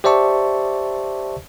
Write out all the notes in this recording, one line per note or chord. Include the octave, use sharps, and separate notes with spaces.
G4 C5 D5 E5 A5 C#6